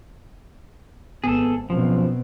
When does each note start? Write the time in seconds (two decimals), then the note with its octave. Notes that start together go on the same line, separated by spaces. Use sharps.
1.24 G#1 B3 G#4 A4
1.70 F#2 B2 F3 C4